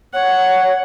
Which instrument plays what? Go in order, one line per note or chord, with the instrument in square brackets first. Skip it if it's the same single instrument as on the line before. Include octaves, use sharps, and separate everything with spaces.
[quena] C#5 [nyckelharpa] F#5